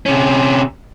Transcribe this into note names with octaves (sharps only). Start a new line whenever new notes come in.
C3 C#4